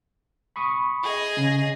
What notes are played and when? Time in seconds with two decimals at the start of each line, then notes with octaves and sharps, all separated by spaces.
0.56 B5 C#6 D#6
1.02 G#4 D#5
1.37 C#3